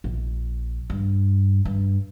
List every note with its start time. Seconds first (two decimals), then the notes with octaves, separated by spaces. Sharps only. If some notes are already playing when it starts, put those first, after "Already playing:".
0.04 A#1
0.90 G2
1.65 G2